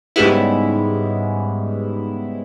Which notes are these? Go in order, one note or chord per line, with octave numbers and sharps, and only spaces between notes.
G#2 C#3 G3 G#3 B3 E4